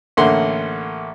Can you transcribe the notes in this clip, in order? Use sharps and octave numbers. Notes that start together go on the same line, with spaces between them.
A1 D3 A#3 F#5 C6